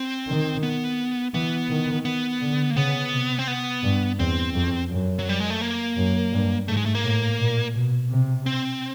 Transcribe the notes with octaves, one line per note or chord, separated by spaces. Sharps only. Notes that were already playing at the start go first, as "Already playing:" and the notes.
Already playing: C4
D#3
B3
E3 B3
D#3
B3
D3
A#3
C#3 B3
C3
C4
B3
G2
E2 C4
F2
F#2
F#3
G3
G#3
A3
A#3
F#2
G2
G#2 A3
G#3
A3
A#3
A2
A#2
B2
C3
C4